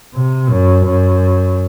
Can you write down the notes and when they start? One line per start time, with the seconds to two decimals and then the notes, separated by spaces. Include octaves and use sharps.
0.14 C3
0.50 F#2
0.85 F#2